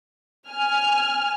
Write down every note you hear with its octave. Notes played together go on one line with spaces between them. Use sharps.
G#5 F6